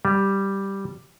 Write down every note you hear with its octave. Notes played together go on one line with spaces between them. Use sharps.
G3